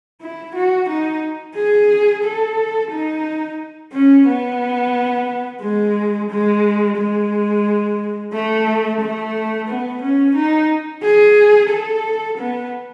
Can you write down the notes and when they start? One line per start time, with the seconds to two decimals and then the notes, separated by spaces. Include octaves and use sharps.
0.21 E4
0.55 F#4
0.89 D#4
1.55 G#4
2.24 A4
2.91 D#4
3.92 C#4
4.27 B3
5.61 G#3
6.30 G#3
6.97 G#3
8.33 A3
9.00 A3
9.68 B3
10.02 C#4
10.35 D#4
11.02 G#4
11.70 A4
12.38 B3